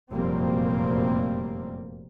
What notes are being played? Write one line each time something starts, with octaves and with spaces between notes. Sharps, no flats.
F1 F#2 A#2 G3 A#3 C4